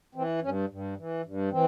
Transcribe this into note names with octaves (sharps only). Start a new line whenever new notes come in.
E3 C4
G2 C#4
G2
E3
G2
E3 C4